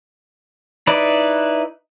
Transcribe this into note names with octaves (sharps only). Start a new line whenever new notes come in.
D#4 E4 B4 D5